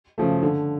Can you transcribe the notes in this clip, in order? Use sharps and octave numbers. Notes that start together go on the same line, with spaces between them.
C#3 F3 A3
D3